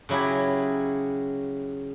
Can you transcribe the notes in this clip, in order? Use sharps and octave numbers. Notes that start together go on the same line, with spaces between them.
C#3 F#3 E4 G4 G#4